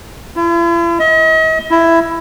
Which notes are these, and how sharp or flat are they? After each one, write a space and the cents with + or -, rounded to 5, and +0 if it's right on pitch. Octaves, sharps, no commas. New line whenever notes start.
E4 +45
D#5 +40
E4 +10